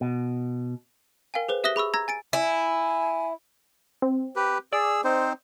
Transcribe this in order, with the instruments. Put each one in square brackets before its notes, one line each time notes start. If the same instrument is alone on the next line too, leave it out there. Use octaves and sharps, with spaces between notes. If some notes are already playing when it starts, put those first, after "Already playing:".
[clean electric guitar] B2
[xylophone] A#4 F5 G5 G#5
G#4 B4 C5
G4 E5 D#6 F#6 A#6 G7
G#4 B5 C#6 E6
A#5 E6 G#6 A#6
G#5 A6 D7
[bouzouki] E4 [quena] G#5
[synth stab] C4
[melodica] G4 B4
[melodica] G#4 E6 [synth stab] D5
[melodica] C4 D#4 C5